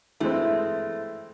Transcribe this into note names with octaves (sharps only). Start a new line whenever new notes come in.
E3 G#3 A3 C4